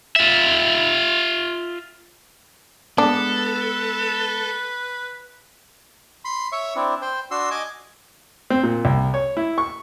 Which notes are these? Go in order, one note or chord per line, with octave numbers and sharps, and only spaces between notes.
F4 E5
G#3 B3 D4 A4 B4
B5 C6
C#5 E5 C#6
C4 D4 E4
C5 G5
D4 F#4 C6 E6
D#5 G#5 D6
C4
A#2
C2
C#5
E4
C#6